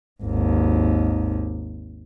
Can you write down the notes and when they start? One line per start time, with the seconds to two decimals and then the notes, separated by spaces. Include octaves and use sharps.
0.23 G#1 D#2